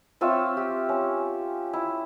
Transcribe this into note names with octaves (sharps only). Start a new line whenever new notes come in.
C4 F4 C#5 E5
G4
C#4
E4